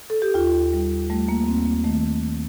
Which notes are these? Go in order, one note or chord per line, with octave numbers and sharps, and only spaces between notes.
A4
G4
D#2 F4
G3
G3 A3
A#3
A#3
D#2 C4
A#3
D#3 A3
D#3